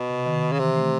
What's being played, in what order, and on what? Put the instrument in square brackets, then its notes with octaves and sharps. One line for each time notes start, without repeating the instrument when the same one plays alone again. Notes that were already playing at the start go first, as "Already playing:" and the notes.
Already playing: [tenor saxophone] B2
[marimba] C3
D#3
D#3
[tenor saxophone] C#3
[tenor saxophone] C3 [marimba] E3
[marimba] A3